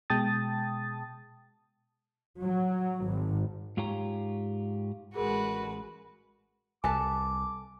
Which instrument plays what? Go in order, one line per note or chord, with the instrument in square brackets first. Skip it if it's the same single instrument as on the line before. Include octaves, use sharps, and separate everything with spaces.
[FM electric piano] B2 G#3 G5 A5 D#6 A6
[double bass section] F#3
G#1
[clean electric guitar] G#2 F4 G4 C#5 A#5
[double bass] A1 G#3 [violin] F#4 [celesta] G#4 A#4 [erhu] B4
[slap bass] C2 [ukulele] A4 B4 A5 [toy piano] G#5 [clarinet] D6